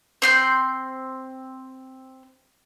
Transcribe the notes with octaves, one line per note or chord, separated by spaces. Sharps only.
C4 C6 G6